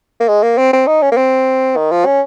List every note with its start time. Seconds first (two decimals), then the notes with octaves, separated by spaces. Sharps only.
0.20 A#3
0.28 G#3
0.43 A#3
0.58 C4
0.73 C4
0.87 D#4
1.02 C#4
1.11 A#3
1.17 C4
1.76 D#3
1.91 F3
2.06 C#4